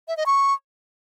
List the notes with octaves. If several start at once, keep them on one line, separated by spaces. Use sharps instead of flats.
E5
D#5
C#6